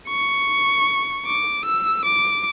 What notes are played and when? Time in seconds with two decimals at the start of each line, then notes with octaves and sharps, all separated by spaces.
0.08 C#6
1.26 D6
1.65 E6
2.05 D6